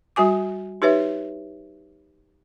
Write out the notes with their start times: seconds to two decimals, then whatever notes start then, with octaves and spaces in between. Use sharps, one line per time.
0.16 G3 F#4 G#5 D6
0.82 D#4 G4 B4 C#5 E5